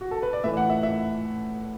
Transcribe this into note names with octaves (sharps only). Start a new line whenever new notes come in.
F#4
A4
B4
D5
A2 E3 E5
F#5
E5
E5